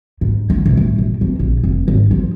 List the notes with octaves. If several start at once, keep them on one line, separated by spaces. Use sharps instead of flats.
G#2
D3
B1
A2
A#1
F2
A#1
F1
G#1
F3